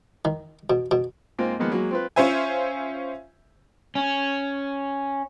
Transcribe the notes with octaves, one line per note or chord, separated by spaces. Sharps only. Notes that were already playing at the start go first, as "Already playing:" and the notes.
D#3
B2
B2
G#2 A#3 C4 F4
D#3 F3 G#3 A#3 B3
F#3 G#3 A#3
C4 F4 B4
C#4 F4 C5 E5 G#5
C#4